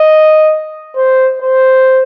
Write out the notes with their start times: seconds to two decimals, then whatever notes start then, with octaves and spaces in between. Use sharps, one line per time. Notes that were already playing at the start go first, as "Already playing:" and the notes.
Already playing: D#5
0.96 C5
1.42 C5